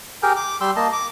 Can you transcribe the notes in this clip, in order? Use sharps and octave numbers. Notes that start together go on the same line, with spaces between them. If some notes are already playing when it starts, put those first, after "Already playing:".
G4 G#4 A#4 G5
D6
G3 G4 C6 E6
A#3 D#5 A5
D6